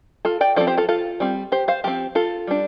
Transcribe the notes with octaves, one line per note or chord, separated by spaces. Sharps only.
F4 A4
D5 G5
F3 C4 A4 D5
G4 C5
F4 A4
F4 A4
G3 C4
G4 C5
C5 F5
F3 C4 G4
F4 A4
G3 D4